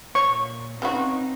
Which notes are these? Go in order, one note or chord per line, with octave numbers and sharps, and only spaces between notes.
A#2 C#5 C#6
C#3 B3 C4 D#4 F#4